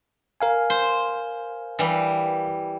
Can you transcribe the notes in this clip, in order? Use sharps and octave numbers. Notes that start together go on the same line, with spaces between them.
A#4 F5 G#5
C5
E3 G3